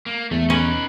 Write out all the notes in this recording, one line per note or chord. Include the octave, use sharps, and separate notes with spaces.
A#3
E2 A3
C#4 D#4 B4